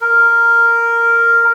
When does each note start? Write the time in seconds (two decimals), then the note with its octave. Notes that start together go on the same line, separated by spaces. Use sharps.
0.01 A#4